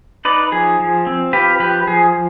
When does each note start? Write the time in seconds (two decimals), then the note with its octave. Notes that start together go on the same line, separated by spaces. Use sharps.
0.25 D#4 B4 D5
0.52 F3 G#4
0.80 F3
1.07 C4
1.33 F4 G4 B4
1.59 F3 G4 B4
1.87 F3 G#4